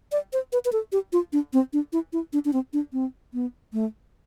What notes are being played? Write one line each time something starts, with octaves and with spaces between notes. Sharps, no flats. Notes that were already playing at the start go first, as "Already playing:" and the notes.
D5
C5
B4
B4
A4
G4
F4
D4
C4
D4
E4
E4
D4
D4
C4
D4
C4
B3
A3